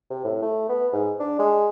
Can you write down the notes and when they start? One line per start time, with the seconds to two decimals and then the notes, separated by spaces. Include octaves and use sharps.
0.10 C3
0.24 A2
0.42 A3
0.69 B3
0.93 G#2
1.19 D4
1.39 G#3